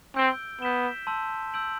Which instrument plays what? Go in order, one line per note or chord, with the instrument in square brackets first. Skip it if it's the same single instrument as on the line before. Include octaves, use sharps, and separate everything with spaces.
[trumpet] C4 [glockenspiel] E6 G6 D7 G7
[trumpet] B3 [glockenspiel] G6 B6 E7 G7
[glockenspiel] A5 C6 E6 G6
E6 G6 D7 F#7